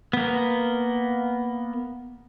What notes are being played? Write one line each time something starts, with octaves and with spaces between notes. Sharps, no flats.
A#3 B3